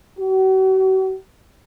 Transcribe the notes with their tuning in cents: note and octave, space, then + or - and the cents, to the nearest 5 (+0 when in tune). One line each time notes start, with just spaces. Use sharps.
F#4 +45